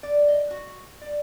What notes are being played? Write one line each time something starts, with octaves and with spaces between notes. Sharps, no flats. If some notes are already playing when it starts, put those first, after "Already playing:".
D5
D#5
F#4
D5